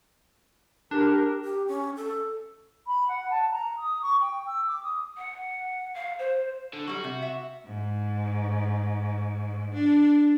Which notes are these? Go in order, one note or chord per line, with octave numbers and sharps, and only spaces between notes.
D4 G4 A#4
G4
C#4
A4
B5
F#5
A5
A#5
D#6
C#6
G5
E6
D6
D#6
F#5
F5
C5
D3
F#3 G3 F#4
C3
E5
G#2
D4